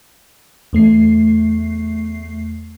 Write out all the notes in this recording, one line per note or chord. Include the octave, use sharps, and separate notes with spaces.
E2 A3 C7